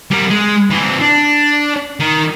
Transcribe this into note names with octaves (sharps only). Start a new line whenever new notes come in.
G3 A#4
G#3
E3 C4
D4
D#3